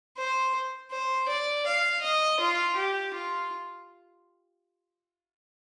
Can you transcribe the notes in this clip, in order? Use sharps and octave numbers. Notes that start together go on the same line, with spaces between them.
C5
C5
D5
F5
D#5
F4
G4
F4